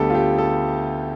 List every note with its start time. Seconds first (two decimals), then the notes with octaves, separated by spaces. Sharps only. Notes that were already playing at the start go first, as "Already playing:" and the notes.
Already playing: D2 D3 G3 B3 G4 A4
0.10 F4
0.15 G4
0.38 A4